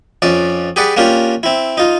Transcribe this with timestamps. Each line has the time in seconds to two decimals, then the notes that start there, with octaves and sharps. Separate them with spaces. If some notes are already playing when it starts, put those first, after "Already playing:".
0.22 F2 C#4 D5
0.76 G4 G#4 B4 D5 F#5
0.97 A#3 C#4 D4 F4 G4
1.43 C4 E4
1.77 D#4 F4